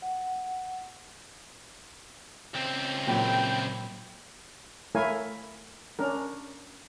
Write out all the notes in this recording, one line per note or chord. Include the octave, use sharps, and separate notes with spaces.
F#5
C#2 C4
A#2 F#3 G5 B5
A3 E4 A#4 C#5 F5 G#5
C#4 D4 A#4